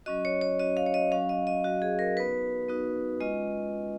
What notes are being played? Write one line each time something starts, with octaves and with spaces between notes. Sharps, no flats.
F#3 C#4 F#4 D#5
C#5
C#5
F#3 C#4 F#4 D#5
F5
C#5
D#5
F#3 C#4 F#4 F5
D#5
D#5
F#3 C#4 F#4
G#4
A#4
B3 D#4 F#4 B4
B3 D#4 F#4
G#3 C#4 F4 D#5